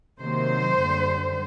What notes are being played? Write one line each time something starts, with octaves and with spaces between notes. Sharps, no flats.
C3 D#3 F#3 A#3 C5
F#2 D3 G3